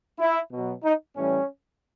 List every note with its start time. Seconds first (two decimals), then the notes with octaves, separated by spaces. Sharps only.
0.19 E4
0.51 B2 F#3
0.83 D#4
1.16 A2 E3 G3 C#4